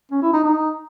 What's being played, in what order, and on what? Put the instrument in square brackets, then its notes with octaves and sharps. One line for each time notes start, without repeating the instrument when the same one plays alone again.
[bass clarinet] C#4
E4
D#4
D#4